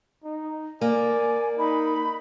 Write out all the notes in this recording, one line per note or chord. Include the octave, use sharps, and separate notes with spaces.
D#4
A#3 D5 G#5
D#4 B5